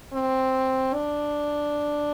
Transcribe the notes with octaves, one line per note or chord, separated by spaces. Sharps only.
C4
D4